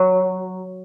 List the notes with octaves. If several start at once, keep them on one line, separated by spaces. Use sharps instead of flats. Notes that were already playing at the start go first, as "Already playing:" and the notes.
Already playing: F#3